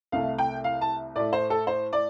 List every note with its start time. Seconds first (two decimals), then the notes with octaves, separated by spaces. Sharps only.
0.12 C2 C3 A3 F5
0.38 G5
0.64 F5
0.81 A5
1.16 A2 A3 D5
1.33 C5
1.50 A4
1.67 C5
1.93 D5